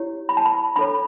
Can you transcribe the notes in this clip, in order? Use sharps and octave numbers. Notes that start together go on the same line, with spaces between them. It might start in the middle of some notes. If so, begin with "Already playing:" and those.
Already playing: E4 G4 C#5
B5
A5
B5
D4 A4 C#5 B5